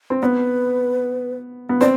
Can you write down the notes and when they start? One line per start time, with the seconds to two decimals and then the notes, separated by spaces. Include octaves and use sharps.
0.10 C4
0.22 B3 B4 D5
1.69 B3
1.81 C4 D5